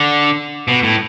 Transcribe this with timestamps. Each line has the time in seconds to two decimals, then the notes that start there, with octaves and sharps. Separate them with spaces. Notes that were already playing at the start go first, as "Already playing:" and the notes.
Already playing: D3
0.68 B2
0.83 A2